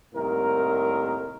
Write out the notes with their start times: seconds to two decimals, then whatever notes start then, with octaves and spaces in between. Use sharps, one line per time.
0.14 C2 A2 D#3 A#3 A#4